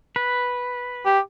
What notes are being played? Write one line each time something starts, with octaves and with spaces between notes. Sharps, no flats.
B4
G4